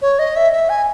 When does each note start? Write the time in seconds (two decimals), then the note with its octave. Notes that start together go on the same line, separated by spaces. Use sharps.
0.02 C#5
0.19 D#5
0.36 E5
0.53 E5
0.69 G#5